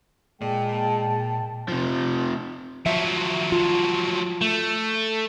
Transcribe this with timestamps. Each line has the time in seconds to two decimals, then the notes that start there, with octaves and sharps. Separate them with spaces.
0.41 A#2 G#3 D5 G5 A5
1.68 C3 F3
2.86 F3 F#3 E5
3.52 F4
4.41 A3